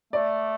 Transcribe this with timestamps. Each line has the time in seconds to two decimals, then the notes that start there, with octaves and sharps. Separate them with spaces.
0.13 A3 D5